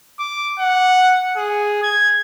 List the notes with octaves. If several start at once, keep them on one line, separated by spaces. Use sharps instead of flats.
D6
F#5
G#4
G#6